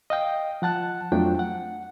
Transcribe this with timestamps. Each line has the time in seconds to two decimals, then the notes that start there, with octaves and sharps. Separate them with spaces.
0.10 D#5 F5 G5
0.62 F3 F#5 A5 F#6
1.12 F2 F3 F#3 A3 D4 G5
1.39 F#5